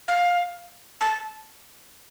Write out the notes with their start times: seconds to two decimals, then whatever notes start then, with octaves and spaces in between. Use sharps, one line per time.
0.08 F5
1.01 A5